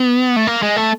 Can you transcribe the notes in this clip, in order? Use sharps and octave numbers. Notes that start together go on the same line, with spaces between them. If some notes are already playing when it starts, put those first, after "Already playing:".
Already playing: B3
A3
A#3
G#3
A3